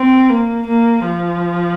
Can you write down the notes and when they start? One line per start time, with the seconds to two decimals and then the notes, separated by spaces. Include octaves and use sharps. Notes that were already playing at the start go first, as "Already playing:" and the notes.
Already playing: C4
0.30 A#3
0.68 A#3
1.05 F3